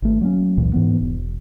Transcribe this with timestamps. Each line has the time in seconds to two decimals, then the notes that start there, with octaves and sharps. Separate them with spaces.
0.02 G#1 A3
0.21 F#3 A#3 B3 C#4
0.57 F1 C#2 A#2 E3
0.73 G#2 E3 B3
1.01 E1